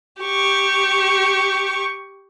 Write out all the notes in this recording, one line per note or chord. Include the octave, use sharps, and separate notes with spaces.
G4 C#6